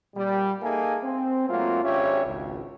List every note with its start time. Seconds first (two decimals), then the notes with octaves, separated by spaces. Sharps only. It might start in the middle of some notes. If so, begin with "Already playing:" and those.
0.15 A#2 G3
0.63 A#3 D#4 G#4 A4 E5 G#5
1.03 C4
1.49 G#2 F#3 A3 A#3 C4 F4
1.84 G#1 C#4 D4 G4 C#5 E5
2.26 G#1 C#2